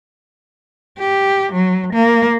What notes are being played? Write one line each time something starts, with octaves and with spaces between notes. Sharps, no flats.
G4
F#3
A#3